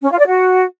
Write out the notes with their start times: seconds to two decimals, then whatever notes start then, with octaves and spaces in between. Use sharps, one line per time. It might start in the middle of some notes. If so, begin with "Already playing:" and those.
0.02 C#4
0.11 F4
0.19 D5
0.27 F#4